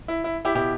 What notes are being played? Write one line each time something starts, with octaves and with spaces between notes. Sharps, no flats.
E4
E4
E4 G4
B2 E4 G4